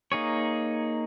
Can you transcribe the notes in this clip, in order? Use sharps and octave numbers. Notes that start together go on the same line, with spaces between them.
A#3 D#4 G#4 C#5